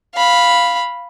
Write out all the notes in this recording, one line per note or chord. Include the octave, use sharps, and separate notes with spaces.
F5 B5